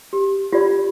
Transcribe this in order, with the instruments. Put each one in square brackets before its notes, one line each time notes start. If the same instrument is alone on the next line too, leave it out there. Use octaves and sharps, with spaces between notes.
[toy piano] G4
[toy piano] F4 D5 B5 [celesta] G4